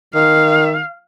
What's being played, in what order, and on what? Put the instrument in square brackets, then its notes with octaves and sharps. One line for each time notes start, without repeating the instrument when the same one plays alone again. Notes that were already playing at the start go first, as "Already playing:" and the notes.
[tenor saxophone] D#3 [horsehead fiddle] F5